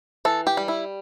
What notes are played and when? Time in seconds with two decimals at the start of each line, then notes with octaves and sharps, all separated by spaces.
0.25 E3 A4
0.47 G4
0.57 G3
0.68 E4